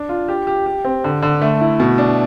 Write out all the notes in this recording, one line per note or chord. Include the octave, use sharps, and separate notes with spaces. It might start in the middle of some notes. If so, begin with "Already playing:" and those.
Already playing: D4
F4
G4
G4
G4
C4
D3
D3
A3
E4
B2
D4